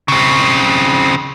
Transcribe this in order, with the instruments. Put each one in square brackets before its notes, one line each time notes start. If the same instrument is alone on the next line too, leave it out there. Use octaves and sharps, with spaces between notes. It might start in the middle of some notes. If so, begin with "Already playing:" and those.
[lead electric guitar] C#3 C4